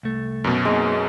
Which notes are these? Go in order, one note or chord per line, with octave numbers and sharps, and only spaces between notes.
C2 A3
F#2 B2
G#3 A#3 C4 D#4